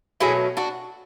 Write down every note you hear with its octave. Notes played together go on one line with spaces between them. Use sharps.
B2 F#3 A3 E4 G#4
D4 F#4